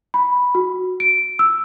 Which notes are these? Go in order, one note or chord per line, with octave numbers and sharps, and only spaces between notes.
B5
F#4
D7
E6